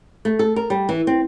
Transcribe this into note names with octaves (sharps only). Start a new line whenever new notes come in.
A3
A4
A#4
G3
E3
C4